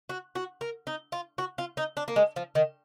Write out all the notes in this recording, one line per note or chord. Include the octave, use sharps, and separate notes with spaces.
F#4
F#4
A#4
D#4
F4
F#4
F4
D#4
D4
A#3
G#3
F3
D#3